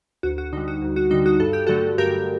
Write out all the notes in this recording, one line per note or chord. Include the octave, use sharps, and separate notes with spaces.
D2 F#4
F#4
D3 G3 D#4
F#4
D2
F#4
D3 G3 D#4
F#4
G2 A4
G4
D3 F#3 A3 F#4 A4
G2 G4 A#4